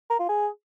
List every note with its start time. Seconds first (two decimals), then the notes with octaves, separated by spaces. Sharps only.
0.10 A#4
0.20 F4
0.29 G#4